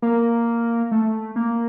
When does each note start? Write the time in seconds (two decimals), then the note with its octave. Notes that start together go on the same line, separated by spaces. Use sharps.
0.02 A#3
0.92 A3
1.36 A#3